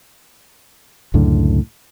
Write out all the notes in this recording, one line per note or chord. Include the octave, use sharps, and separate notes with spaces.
C#2 F#2 A2 D3